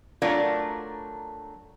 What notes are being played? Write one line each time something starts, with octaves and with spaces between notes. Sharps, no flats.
F#3 A3 D4 F4 A#4